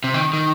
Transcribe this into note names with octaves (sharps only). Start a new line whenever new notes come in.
C3
D#3
D#3